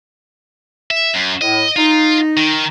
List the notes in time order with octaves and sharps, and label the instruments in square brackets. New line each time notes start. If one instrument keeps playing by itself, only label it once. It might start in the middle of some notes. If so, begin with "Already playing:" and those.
[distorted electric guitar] E5
F#2
[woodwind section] A2 [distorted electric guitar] D#5
[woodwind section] D#4 [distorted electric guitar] F4
[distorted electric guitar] D#3